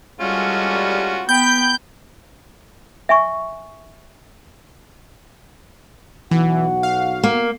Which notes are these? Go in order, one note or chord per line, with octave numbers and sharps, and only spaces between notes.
G3 G#3 C#4 F4 F#4 A4
B3 G5 B5 G6
E5 G#5 C#6
B1 E3 F#4 F#5
F5
A#3